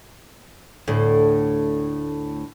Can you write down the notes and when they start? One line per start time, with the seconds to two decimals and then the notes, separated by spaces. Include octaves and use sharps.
0.88 D2 A2